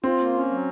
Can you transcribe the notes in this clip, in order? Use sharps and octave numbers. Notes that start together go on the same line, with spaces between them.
C4 F4
A#3
C#4
F#3